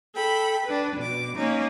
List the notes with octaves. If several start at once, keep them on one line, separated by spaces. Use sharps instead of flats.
A4 G5 B5
D4 B4
B2 D6
A#3 C#4 D#4